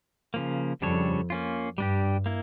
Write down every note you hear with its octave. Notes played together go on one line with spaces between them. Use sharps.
C#3 F3 A#3
F2 C#3 G3 D4 A4 C#5
A#3 C#4 F4
G2 G3 D4 G4
A#3 E4